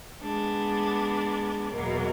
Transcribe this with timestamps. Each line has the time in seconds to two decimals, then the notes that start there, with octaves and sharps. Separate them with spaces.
0.21 G#3 B3 D4
1.73 E2 B2 F#3 A#3